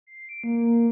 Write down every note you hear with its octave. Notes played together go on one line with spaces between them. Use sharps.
C7
D7
A#3